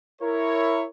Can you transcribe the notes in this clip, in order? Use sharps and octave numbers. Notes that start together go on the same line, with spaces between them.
E4 A#4 C#5